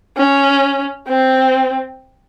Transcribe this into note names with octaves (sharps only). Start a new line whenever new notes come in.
C#4
C4